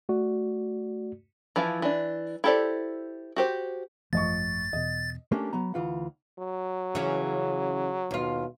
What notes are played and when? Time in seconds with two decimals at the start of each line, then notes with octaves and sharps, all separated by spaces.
0.09 A3 F#4 D5
1.56 E3 F3 E4 F4
1.82 E3 D4
2.44 E4 G4 A4 C5 D5
3.36 F#4 G4 C5
4.13 G#1 F#2 F3 A3 D#5 C#6 A6
4.73 E2 B2 D#5
5.32 A3 A#3 C#4 D4 G4
5.53 F#3 B3 A#5
5.74 D2 E3 F4 F#5
6.39 F#3
6.95 C#3 E3 C#4
8.11 D#2 B2 F4